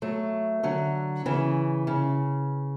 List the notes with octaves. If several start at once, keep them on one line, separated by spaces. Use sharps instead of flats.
F#3 A3
D3 F#3
C#3 E3
C#3